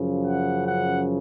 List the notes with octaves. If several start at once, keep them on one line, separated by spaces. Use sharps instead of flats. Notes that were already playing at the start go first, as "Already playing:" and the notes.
Already playing: F#2 C#3 F3
F#5
F#5